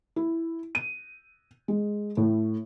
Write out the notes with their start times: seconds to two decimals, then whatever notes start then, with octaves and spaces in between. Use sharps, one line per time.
0.16 E4
0.75 D#7
1.68 G#3
2.17 A2